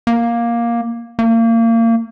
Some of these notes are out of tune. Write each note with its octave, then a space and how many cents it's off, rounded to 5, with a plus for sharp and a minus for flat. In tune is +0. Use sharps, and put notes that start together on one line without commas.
A#3 +10
A#3 -30